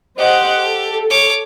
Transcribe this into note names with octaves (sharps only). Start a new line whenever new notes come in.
G4 C5 D#5 F#5
A4
C#5 D6